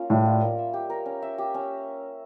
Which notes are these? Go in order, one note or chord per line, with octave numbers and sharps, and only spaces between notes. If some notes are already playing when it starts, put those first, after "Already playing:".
Already playing: A#3 C#4 F4
A2 G3
F4
A#3
E5
G4
A#4
C#4
E5
G4
C#4